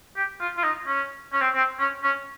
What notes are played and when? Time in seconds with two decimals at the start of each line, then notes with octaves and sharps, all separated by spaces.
0.16 G4
0.40 F4
0.57 F4
0.64 D#4
0.87 C#4
1.33 C#4
1.41 C4
1.54 C4
1.80 C#4
2.03 C#4